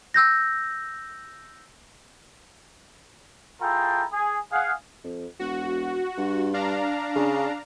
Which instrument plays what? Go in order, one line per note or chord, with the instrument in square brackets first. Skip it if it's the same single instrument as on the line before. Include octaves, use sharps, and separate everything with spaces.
[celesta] E6 G6 A#6
[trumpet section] E4 F4 G#4 A4 G5 A#5
G#4
G#4 F5 F#5
[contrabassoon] F2
[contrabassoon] E1 [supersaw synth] F#4
[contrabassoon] G2
[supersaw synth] D4 F5 A#5
[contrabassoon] C#3